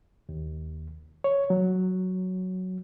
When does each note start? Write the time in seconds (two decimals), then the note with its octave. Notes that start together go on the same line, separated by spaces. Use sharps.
0.29 D#2
1.24 C#5
1.50 F#3